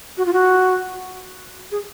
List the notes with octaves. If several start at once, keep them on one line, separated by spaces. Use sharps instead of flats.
F#4
F4
F#4
G#4